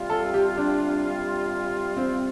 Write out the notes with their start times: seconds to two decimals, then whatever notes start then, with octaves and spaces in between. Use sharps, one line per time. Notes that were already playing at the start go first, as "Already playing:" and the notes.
Already playing: C3 G3 F4
0.10 A4
0.34 G4
0.57 D4
1.97 C4